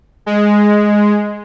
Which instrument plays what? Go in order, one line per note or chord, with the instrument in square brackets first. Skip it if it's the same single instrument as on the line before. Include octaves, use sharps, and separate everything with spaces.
[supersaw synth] G#3